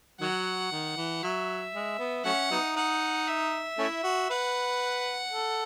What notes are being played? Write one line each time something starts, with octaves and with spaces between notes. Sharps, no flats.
D#3 F#3 F#5
D#3
E3
F#3 E5
G#3
B3
F#3 A3 C#4 F#5
F#3 B3 D#4
D#4 F#5
E5
A3 C#4 E4
F#4
B4 F#5
A4